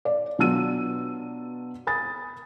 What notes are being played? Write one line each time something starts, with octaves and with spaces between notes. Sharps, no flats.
D5
B2 F#3 D4 F4 E6 D#7
G#5 B5 D#6 A6